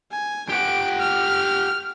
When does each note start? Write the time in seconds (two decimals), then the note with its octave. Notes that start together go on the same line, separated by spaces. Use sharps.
0.11 G#5
0.49 G4 F#5 D7
0.99 F6